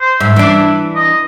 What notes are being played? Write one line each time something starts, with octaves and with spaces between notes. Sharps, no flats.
C5
G#2 E5
E3 D4
D#5